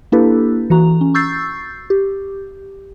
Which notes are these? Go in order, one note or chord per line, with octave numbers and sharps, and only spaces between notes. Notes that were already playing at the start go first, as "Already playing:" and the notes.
A#3 D4 E4 G4 A4 B4
E3 F#4 A#5
C#4
C#6 E6 G6 A6 C7
G4